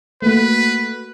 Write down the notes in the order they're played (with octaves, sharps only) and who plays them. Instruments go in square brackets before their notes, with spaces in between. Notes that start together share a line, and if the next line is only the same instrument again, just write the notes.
[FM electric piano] A3 A#3 F#4 [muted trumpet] B4